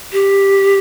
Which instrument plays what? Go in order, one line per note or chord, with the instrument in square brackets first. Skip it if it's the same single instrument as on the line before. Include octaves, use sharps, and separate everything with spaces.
[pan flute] G4